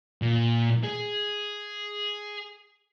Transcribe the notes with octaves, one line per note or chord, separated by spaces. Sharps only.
A#2
G#4